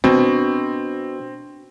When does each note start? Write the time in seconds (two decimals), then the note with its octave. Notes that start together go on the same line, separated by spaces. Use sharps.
0.04 B2 C4 D4